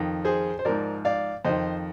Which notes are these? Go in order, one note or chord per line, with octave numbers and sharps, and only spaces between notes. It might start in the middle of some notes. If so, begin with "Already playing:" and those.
Already playing: F2 D#3
G#4 C5
C5
G#2 F3 A#4 D5
D5 F5
F2 D#3 C5 D#5